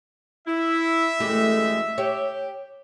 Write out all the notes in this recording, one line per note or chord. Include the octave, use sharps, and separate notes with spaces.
E4 E5
F#2 E3 G#3 A3 E4 G4
G4 C#5